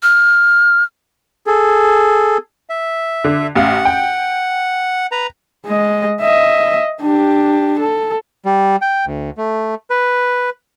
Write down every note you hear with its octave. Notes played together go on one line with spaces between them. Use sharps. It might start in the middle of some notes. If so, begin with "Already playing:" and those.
F6
G#4 A4
E5
D3
A1 F5 F#5
G5
B4 A#5
G#3 D#5
D#5 E5
D4 G4
A4
G3
G5
D2
A3
B4